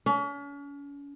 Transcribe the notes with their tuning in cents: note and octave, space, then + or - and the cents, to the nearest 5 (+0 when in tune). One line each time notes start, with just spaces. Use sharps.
C#4 +40